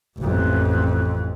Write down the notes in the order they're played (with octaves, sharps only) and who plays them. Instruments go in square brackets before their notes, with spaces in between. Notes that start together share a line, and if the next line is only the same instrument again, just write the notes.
[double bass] A1 F2